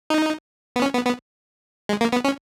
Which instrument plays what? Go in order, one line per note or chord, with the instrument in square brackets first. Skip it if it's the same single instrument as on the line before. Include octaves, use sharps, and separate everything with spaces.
[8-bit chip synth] D#4
B3
C#4
B3
B3
G#3
A#3
B3
C#4